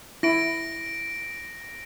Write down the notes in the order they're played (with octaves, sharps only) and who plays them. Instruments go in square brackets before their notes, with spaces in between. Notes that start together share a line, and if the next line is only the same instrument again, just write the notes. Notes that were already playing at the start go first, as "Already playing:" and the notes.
[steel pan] E4 [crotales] A#6 D7